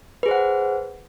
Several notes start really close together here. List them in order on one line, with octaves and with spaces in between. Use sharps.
B4 G#4 C5 F#5